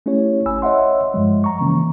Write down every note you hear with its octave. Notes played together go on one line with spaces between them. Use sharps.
A3 C#4 E4 G4 C#5
G#1 G#5 B5 E6
C#5 D#5 E5 F#5 C6
G2 F3 G#3
A#5 C#6
C#3 E3 A#3 C#4